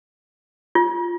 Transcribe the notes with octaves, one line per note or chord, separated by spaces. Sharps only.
F4